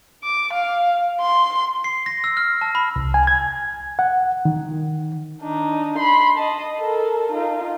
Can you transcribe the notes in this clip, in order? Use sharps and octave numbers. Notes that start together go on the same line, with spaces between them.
D6
F5
C6
C7
A#6
E6
F6
A5
B5
C2
G#5
G#6
F#5
D#3
D4 D#4
B5 C6
D#5 A5
A4 A#4
D#4 F4